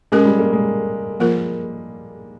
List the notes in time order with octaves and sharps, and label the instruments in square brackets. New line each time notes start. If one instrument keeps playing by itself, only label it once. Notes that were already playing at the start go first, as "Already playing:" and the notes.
[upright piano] G#3 [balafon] C#4 G4 A#4
[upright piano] G3
A#3
G#3
[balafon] F3 A#3 F4 A#4